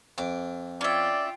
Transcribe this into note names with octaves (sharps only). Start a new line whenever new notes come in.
F2 D6
C#4 F4 D5 E5 G5